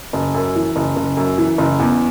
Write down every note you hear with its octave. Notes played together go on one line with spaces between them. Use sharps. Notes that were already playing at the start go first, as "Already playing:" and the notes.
F#1
F#2
E3
F#1
F#1
F#2
E3
F#1
E2